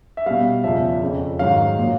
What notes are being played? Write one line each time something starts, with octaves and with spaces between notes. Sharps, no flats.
E5
B2 G3 F5
E2 C#3 F3 E5
F2 C#3 F3
G#2 D#3 F#3 F5
A#2 F#3